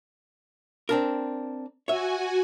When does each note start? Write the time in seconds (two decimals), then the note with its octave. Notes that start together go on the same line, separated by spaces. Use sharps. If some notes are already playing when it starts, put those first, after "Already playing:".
0.89 C4 D4 A#4
1.88 F#4 C#5 E5 G#5